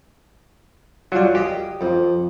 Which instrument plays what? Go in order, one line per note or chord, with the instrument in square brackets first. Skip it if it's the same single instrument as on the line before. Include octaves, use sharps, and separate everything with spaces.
[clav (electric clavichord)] F#3 G3 [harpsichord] F4 G#5
[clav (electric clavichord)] G4 [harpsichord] G#4 D#5
[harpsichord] F2